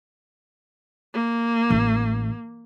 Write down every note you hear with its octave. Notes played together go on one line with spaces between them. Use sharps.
A#3
A1